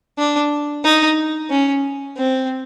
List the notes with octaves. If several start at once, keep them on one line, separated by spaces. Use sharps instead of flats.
D4
D#4
C#4
C4